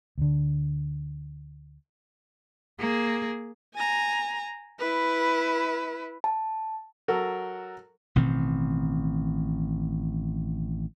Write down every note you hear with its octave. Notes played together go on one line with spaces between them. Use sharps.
D2 D3
A#3 G#4
G#5 A#5
E4 B4
A5
F#3 F#4 A4 A#4
A1 B2 D#3 C4